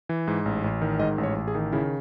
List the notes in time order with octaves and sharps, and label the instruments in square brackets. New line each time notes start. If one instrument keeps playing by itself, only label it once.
[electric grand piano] E3
G#2
A1
A1
D#3
G#2 D#5
A1
C#5
A1
G#4
D#3
C#3 E4